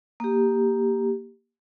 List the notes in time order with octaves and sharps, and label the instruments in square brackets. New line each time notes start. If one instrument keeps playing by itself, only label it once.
[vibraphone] A#3 G4